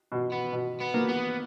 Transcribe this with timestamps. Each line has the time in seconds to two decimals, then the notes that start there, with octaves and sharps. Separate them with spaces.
0.12 B2
0.32 B3
0.52 B2
0.80 B3
0.94 A#3
1.08 B3